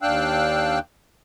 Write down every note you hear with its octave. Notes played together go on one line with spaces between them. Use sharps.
D#2 D4 F5 G5 E6 F#6